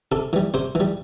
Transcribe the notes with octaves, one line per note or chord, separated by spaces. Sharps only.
C3 A4
E3 G3
C3 C5
E3
G3